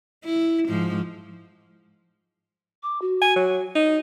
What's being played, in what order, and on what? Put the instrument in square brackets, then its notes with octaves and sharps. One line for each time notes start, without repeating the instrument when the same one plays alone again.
[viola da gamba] E4
G#2 F3
[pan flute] D6
F#4
[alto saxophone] G#5
F#3
[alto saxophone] D#4 [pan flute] D#5